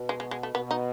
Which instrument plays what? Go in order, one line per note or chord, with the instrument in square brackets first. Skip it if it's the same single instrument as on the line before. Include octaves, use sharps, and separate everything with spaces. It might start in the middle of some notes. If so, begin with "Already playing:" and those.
Already playing: [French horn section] B2
[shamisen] G#3
G#3
G#3
A3
[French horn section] B2 [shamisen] B3
[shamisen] D#4